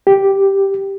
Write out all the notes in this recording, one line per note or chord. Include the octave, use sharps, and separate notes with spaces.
G4